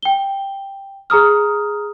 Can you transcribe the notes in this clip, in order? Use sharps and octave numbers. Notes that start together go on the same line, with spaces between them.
G5 G7
G#4 A#5 D#6 F6